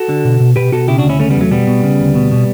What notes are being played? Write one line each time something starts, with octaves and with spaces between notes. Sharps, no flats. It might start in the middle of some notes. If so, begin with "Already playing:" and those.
Already playing: F#4 A4
D3
B2
B2
B2 G4 B4
B2 F#4 A4
C#3 E4 G4
D4 F#4
D2
C#4 E4
C#3 A3 C#4
G3 B3
E2
F#3 A3
B2 G3 B3
B2
C#3
D2
B2
B2